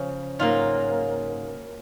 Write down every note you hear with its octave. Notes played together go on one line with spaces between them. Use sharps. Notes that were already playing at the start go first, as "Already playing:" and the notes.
Already playing: C#3 F3 C#4
G#2 F#3 A#3 F4